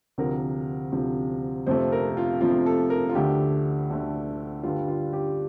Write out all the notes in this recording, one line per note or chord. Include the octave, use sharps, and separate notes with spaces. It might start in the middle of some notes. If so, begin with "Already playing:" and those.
D2 C3 F3 A#4
D2 C3 F3
F2 C3 F3 A3 C5
A#4
F4
F2 C3 F3 A3 F4
A4
A#4
F4
D2 D3 A3 G4
D2 D3 A3
G2 D3 G3 F4
F4
G4